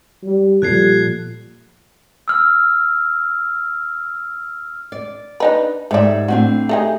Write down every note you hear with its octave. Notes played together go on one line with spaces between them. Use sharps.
G3
A#2 F3 G3 A4 F#6 G#6 C7
E6 F6
D5
D4 D#4 B4
G#2 A3 G4 D5 E5
A2 C4 D4 F#4
A3 D#4 G4 G#4